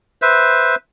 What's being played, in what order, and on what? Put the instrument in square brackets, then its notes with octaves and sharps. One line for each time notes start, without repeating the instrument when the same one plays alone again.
[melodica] B4 C5 E5